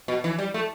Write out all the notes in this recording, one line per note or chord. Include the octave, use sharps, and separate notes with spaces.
B2
E3
G3
A3